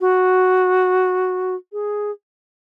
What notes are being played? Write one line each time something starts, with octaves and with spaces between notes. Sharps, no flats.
F#4
G#4